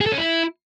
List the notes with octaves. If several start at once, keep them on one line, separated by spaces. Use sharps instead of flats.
G#4
A4
C#4
E4